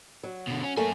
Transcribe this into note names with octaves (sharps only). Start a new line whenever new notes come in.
F#3
B2 D3
C#4
F#2 A3 A#3 C#4 G#5